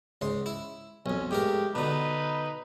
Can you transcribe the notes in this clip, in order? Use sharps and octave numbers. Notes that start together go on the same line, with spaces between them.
C#2 G#2 C6
E4
B1 F2 C#4
G#2 A3 G4 A#4
B2 D3 D#4 B4